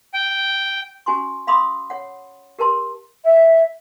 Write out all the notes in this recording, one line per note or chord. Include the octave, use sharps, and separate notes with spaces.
G5
C#4 F#4 G#5 C6 C#6
F5 B5 C6 D6 D#6
C#5 F#5
G4 A#4 B4 A5 C6
E5